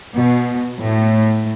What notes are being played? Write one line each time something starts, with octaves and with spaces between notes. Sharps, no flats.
B2
A2